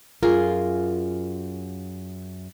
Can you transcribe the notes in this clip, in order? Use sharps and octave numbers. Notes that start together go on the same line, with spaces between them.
F#2 F4 G#4 A#4